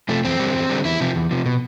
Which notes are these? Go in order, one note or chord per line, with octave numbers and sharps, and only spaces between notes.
C3 F3 A3
E2 C4
D3 G3
E2
D3 G3
E2 E4
C3 F3
E2
C3 F3
B2